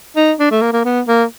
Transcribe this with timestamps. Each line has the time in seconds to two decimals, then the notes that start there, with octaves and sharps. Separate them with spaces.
0.17 D#4
0.40 D4
0.51 A3
0.62 A#3
0.73 A#3
0.85 B3
1.08 A#3